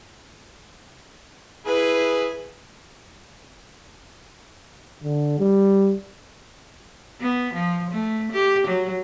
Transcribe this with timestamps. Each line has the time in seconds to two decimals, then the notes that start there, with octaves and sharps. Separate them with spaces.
1.66 E4 G#4 B4
5.04 D3
5.39 G3
7.21 B3
7.54 F3
7.91 A3
8.32 G4
8.67 F#3